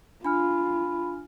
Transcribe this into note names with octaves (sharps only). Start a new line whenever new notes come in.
D4 F4 G#5 B5 F6